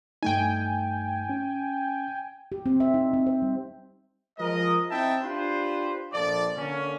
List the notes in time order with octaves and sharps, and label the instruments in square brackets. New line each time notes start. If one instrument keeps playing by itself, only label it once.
[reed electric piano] G2 A3 D#4 [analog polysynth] G5 G#5
[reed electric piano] C#4
[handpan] G4
C4
E5
D#4
C4
C5
G3
[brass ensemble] F3 G#3 A#4 D#5
C4 D#4 E4 E5 G5 A5
D4 F4 G4 B4 C5
A#1 F3 A4 D5
D3 A#3 C#4